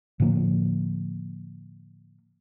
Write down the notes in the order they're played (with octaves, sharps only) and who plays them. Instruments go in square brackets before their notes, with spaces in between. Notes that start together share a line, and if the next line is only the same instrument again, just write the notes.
[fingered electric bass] A2 D3 F3 A#3